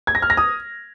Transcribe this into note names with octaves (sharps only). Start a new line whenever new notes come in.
G#6
A#6
F6
A#6
D#6